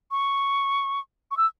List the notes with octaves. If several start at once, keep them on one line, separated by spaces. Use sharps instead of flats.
C#6
C#6
E6